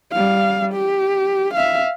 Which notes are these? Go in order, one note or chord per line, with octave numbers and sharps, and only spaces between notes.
G3 F5
G4
E5 F5